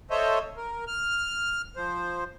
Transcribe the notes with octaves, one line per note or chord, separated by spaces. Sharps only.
A4 C5 C#5 D#5 E5
A#4
F6
F3 C5